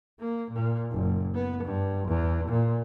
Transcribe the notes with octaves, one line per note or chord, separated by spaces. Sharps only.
A#3
A#2
F#1
B3
G2
E2
A#2